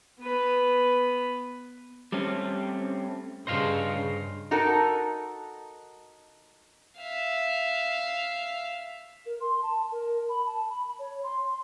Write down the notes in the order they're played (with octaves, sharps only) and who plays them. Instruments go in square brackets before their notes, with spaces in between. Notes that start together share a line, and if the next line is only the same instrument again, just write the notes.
[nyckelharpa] B3 B4
[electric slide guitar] G3 A3 C4 C#4
[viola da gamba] G2 C#3 [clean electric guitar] C5 D#5 F5
[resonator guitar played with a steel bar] D#4 F#4 A4 A#4
[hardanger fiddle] E5 F5
[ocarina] A#4
C6
A5
A#4
B5
A5
B5
C#5
C6